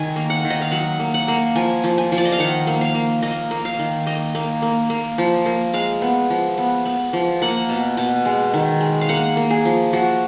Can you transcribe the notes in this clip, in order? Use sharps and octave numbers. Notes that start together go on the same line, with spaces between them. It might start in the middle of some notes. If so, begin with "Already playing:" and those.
Already playing: D#3 G#5
A#3
F#5
D#3
D#5
F5
F#3 F#5
A#3
F#5
A#3
F3 G#5
F3
G#5
F3
D5
D#5
F5
D#3 F#5
A#3
F5
A#3
A#3 D#5
A#3
F5
D#3
A#3 D#5
A#3
A#3
A#3
F3
A#3
G#3 F5
B3
F3
B3
B3
F3
A#3 F#5
B2
B2
G#3
D#3
G#3
F5
A#3 F#5
A#3
G#4
F3
F3 F#4